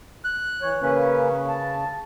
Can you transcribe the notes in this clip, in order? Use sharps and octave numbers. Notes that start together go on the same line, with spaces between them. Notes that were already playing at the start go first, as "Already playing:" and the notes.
F#6
E3 C#5
C#3 A#3 C#4 B4
A5